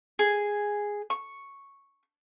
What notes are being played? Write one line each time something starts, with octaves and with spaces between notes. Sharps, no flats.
G#4
C#6